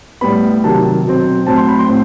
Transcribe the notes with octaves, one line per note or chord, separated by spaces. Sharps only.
A2 G3 B3 B5
C3 D#3 F#3 A5
B2 F#3 C4
A2 F#3 C4 A5
C6
B5
C6
A2 C4